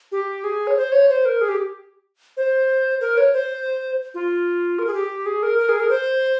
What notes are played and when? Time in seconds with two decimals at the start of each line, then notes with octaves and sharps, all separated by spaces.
0.12 G4
0.44 G#4
0.67 C#5
0.77 C5
0.92 C#5
1.09 C5
1.25 A#4
1.41 G#4
1.49 G4
2.37 C5
3.01 A#4
3.17 C#5
3.33 C5
4.14 F4
4.79 A#4
4.87 G#4
4.94 G4
5.26 G#4
5.43 A#4
5.59 A#4
5.69 G#4
5.80 A#4
5.90 C5